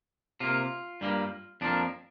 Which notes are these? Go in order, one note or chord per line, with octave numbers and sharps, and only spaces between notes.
C3 A#3 F4
G2 G3 A#3
F2 F3 A#3 D4